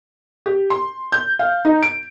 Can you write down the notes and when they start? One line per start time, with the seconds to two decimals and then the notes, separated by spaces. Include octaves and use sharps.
0.46 G4
0.70 C6
1.12 G6
1.39 F5
1.65 D#4
1.83 D7